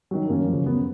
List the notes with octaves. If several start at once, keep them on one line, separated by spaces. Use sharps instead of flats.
D#3 F#3
F#2 A#3 C#4
C#3 F3
F#2 B3